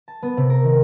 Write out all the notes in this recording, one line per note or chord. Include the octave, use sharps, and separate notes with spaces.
A5
B3
C3
A#4
D#3